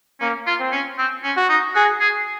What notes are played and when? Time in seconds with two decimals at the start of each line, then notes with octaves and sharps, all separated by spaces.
0.21 A#3 C#4
0.47 F4
0.60 C4
0.72 C#4
0.98 C4
1.24 C#4
1.37 F#4
1.49 D#4
1.75 F#4 G#4
2.00 G#4